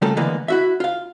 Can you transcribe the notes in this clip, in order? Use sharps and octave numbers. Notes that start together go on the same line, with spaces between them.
C#3 G3 A3 A#3 F4 A4
D3 E3 G#3 A#3 B3
E4 F#4 E5
F4 F5